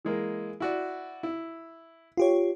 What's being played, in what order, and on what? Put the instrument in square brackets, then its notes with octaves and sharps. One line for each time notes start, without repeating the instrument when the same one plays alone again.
[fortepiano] E3 G#3 A#3
E4 F#4 D5
E4
[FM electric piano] F4 G4 C#5